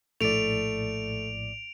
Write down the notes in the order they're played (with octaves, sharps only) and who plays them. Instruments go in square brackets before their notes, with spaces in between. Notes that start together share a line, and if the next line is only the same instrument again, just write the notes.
[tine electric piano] A#1 A2 D5 [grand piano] A3 [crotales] D7 F7